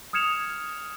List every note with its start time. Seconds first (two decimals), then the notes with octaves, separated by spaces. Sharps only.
0.13 D#6 F6 G#6 C#7 E7 F7